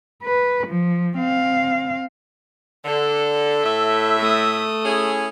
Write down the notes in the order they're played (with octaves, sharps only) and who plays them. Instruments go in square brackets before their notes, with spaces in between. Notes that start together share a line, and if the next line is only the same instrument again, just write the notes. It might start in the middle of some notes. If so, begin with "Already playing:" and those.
[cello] B4
F3
C4 F5
[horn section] D3 [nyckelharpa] A4
[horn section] A2 E5
[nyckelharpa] A3 D#6
[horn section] C#4 E4 G#4